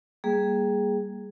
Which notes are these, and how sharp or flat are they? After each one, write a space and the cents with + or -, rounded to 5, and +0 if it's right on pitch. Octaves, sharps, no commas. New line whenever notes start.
G3 +0 A#3 +0 G#4 +0